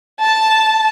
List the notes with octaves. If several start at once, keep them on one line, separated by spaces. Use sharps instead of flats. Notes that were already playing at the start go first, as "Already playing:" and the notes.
A5